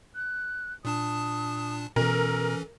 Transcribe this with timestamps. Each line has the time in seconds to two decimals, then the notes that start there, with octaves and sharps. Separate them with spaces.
0.15 F#6
0.85 A#2 D4 A5 D#6
1.96 B2 E3 C#4 A4 A#4